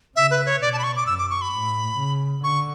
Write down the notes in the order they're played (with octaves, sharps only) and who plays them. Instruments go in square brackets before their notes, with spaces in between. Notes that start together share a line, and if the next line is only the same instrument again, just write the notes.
[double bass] C#3 [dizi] E5
[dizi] B4
C#5
[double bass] B2 [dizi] D5
[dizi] A5
B5
C#6
D6
[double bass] F#2 [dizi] E6
[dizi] D6
C#6
B5
[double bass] A2
C#3
[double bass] D3 [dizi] C#6